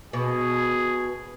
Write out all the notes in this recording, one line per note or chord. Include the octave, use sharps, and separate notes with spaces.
B2 G#4